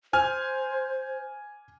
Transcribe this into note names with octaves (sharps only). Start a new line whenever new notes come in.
C5 G#5 F6